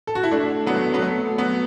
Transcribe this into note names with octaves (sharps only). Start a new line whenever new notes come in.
A4
F#4
E4
A3 D4
F#3 B3
A3
F#3 B3
A3
F#3 B3